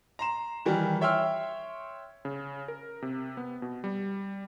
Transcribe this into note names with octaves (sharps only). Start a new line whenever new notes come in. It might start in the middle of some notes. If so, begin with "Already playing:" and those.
A#5 C6 E7
D#3 E3 G3 A#4
C#5 E5 G5 C6 E6 F6
C#3
A#4
C3
B3
B2
G3